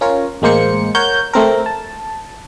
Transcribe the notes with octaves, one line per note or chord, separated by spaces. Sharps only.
C#4 F4 A#4 C#5
A1 G#3 A#3 C5 C#7
A#4 C#5 F#5 G6
A3 C4 A#4
A5